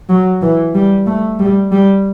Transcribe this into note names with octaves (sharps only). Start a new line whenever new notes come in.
F#3
E3
G3
A3
G3
G3